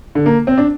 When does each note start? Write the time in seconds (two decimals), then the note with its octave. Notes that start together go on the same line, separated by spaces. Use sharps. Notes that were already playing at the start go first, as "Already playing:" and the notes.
0.15 D3
0.26 A#3
0.47 C4
0.58 D4